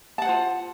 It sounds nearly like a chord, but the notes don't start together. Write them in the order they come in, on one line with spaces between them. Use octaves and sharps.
A5 F#5 C5 F4